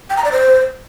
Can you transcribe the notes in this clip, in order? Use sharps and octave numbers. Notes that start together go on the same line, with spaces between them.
G5
A#5
D5
C5